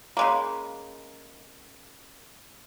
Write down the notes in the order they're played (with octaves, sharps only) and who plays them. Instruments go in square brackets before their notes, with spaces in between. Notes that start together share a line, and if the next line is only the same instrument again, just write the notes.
[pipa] C#3 G#3 A#3